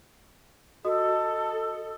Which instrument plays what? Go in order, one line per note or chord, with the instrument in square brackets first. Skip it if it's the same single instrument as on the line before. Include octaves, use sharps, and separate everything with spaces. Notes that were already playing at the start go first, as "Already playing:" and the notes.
[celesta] F#4 D#5 D#6 [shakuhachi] A4